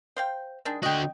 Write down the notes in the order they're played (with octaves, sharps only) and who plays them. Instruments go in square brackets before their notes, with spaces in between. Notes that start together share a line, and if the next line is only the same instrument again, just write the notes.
[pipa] C5 F5 G5
D#3 G#3 D4
[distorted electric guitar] D3 F#4 [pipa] D#5 G5